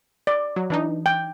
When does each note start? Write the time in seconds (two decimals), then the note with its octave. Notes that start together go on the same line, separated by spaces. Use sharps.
0.27 D5
0.56 F#3
0.70 E3 D4 D#4
1.06 G5